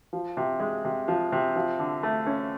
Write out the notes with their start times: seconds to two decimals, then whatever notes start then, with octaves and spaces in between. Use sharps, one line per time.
0.13 F3
0.37 C3
0.60 G#3
0.85 C3
1.08 F3
1.32 C3
1.56 F3
1.79 D3
2.03 A3
2.26 C#4